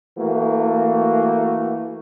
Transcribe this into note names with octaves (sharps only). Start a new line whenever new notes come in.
E3 A3 A#3 F#4